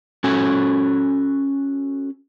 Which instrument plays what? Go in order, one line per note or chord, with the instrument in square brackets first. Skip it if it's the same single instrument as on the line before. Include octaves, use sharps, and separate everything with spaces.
[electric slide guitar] C#4 F#4 A4 G#5